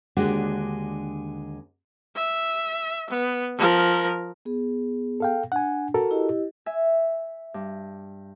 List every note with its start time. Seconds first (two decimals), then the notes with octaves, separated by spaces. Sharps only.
0.17 D#2 D3 G#3 D4 F#4 G4
2.16 E5
3.10 B3
3.58 F3 A#4
4.45 B3 G#4
5.20 A4 F5 G5
5.52 D4 F#5 G#5
5.94 F#4 A4 A#4
6.11 E4 G4 D#5
6.66 E5 G#5
7.54 G2